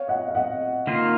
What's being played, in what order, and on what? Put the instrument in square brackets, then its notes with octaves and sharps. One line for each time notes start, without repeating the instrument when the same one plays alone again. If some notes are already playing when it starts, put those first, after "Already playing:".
Already playing: [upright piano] C#5 F5
D#5 F#5
F5
D#5 F#5
[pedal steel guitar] D#3 A#3 F4